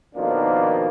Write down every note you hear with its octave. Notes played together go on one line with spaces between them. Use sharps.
F2 B2 D#3 F3 A#3 D4